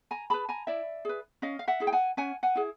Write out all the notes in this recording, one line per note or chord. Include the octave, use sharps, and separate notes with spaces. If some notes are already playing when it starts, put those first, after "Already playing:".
G#5 A#5
G#4 B4 A5 B5
G#5 A#5
E4 D5 E5
G#4 B4
C#4 D#5 F5
F5
E5 F#5
E4 G#4
G5
F#5 G#5
C#4 F#5 G#5
F#5 G#5
E4 G#4